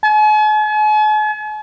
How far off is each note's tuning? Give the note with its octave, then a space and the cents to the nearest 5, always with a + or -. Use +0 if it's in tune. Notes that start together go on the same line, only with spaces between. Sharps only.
G#5 +45